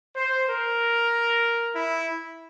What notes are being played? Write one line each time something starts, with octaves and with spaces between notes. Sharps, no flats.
C5
A#4
E4